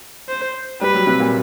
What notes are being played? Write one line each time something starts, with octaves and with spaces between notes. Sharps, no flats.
C5
G3 B4
F#3
C3
A#2